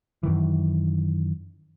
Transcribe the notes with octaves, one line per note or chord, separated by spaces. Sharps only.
F#2 D#3 E3